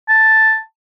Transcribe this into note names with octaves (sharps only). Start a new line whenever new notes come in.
A5